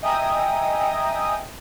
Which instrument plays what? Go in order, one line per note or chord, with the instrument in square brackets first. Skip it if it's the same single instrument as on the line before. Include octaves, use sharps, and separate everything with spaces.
[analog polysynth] D#5 E5 G5 G#5 A#5 D#6